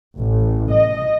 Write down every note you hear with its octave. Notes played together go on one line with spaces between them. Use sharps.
A1
D#5